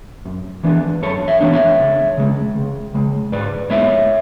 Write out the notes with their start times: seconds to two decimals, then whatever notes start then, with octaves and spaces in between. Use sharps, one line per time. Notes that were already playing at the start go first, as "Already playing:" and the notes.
0.25 F#2
0.63 E3 B3 D4
1.02 F#2 A4 C#5
1.28 C#5 E5
1.41 E3 B3 D4
1.53 C#5 E5
1.79 C#2
2.17 C#3 G#3
2.55 C#2
2.94 C#3 G#3
3.32 G#2 B4 D5
3.70 G#3 B3 E4 C#5 E5